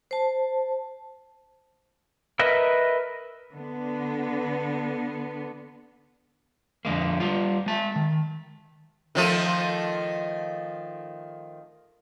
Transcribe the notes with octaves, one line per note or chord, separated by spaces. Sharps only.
C5 A5
A#4 B4 D#5 E5
D3 B3
F2 D3 G#3 A#3
G3 F4
G#3 A5
D#3
D#3 F3 A3